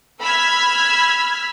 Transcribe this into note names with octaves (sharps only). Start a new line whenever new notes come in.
B5 E6 F6 G#6 B6